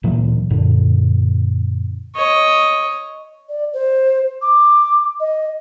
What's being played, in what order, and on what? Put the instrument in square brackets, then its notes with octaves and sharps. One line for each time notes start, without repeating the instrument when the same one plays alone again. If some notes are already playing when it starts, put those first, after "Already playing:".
[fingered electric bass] D1 A#2 E3 F#3
F#2 A#2 D3
[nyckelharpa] C#5 D#5
[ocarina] D5
C5
D6
D#5